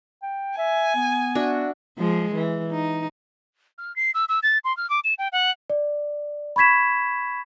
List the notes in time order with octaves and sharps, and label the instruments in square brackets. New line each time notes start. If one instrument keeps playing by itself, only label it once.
[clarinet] G5
[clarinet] E5 [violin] G#5
[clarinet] B3
[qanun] D4 F#4 E5
[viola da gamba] F3 G#3
E3
D#4
[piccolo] F6
C7
E6
E6
A6
C6
F6
D6
E7
G5
F#5
[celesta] D5
B5 C#6 G#6 B6 E7